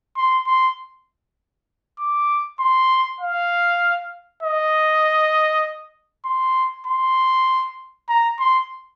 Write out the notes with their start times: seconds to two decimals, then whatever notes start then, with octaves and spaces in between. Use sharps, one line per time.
0.17 C6
0.47 C6
1.99 D6
2.60 C6
3.21 F5
4.43 D#5
6.25 C6
6.86 C6
8.09 A#5
8.39 C6